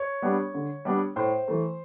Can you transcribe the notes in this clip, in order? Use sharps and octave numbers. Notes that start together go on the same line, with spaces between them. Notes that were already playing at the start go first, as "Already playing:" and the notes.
Already playing: C#5
G3 B3 D4
D3
G3 B3 D4
A2 C5
E3 A3